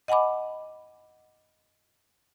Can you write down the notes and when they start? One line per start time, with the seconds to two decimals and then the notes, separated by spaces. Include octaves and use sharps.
0.08 D#5 F#5 G#5 B5 D6